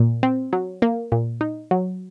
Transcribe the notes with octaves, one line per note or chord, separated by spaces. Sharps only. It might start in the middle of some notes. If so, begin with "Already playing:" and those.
Already playing: A#2
C4
F#3
A#3
A#2
D#4
F#3